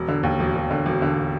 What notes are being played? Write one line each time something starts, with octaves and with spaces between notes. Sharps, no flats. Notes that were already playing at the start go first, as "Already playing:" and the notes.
Already playing: E1
D3
D#2
E1
E1
D3
E1
D3